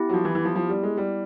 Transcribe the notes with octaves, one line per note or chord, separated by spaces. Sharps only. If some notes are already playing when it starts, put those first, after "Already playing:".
Already playing: B3 E4 G4
F#3
F3
E3
E3
F3
F3
G3
G#3
G3